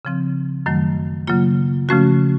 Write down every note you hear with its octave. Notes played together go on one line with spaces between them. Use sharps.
C#3 F3 C4
F#2 D#3 F#3 A3
C#3 F#3 A#3 F4
C#3 F3 A3 C#4 F#4